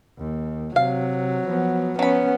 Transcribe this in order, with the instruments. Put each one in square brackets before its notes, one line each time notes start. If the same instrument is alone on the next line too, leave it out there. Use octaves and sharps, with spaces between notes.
[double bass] D#2
[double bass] C3 [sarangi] F#3 [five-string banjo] F5
[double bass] F3 B3
[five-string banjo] F#3 B5 [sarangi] B3 [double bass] C#4